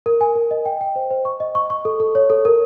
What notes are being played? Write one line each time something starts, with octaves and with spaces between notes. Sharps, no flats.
A#4
G#5
A#4
D#5
G5
G5
C5
C5
C#6
D#5
C#6
C#6
A4
A4
C#5
A4
A#4